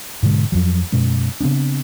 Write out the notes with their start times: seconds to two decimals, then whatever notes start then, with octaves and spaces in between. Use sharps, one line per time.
0.23 G#2 B2 D3 G#3
0.52 F2 F3 F#3
0.92 F#2 B2 G#3 C#4
1.41 C#3 B3 C4 D4